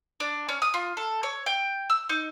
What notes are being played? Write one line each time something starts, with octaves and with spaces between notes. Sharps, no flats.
D4
C#4
D#6
F4
A4
C#5
G5
E6
D#4